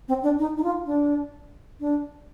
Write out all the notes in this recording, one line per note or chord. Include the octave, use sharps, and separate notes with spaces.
C4
D4
D#4
D#4
F4
D4
D4